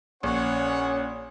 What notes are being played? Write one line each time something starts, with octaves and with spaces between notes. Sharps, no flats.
A#1 C#4 C#5 F#5